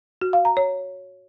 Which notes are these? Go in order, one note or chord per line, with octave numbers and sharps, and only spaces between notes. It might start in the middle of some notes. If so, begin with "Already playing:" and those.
F#4
F5
A#5
C#5